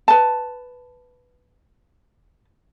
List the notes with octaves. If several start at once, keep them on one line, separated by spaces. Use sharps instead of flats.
B4 A5